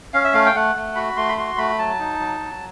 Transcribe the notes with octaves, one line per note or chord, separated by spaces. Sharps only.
C#4 F5
E5
A3 F5
G5
A3 F#5
A3
F#4 B5
A3 C6
B5
F#4 C6
A3 B5
F#3 A5
D#4
F#3
F#3